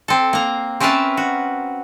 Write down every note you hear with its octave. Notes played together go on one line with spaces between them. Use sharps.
C4 A4
A#3 A#5
C4 C#4 A#4 B4 E5 A5
F#4